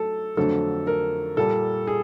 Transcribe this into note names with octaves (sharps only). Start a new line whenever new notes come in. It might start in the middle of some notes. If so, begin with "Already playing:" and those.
Already playing: F#3 A3 A4
F2 D3 F#3 A3 A4
A#4
A#2 G3 A4
G#4